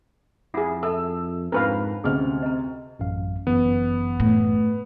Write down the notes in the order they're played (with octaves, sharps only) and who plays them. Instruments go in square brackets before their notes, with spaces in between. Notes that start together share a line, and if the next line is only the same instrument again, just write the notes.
[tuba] F2 [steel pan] E4 G#4 [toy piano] F4 F#5
[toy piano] A4 E5 A5 [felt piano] E6
[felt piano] F2 [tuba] G#2 [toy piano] D4 F4 [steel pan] A#4 B4 F5
[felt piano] D2 C3 F6 [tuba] C#4 [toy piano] G#4 D#5
[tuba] C4 [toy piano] D#5 A#5
[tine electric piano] A1 F#2 F5
[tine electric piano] G1 F#2 E3 [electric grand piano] B3
[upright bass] A2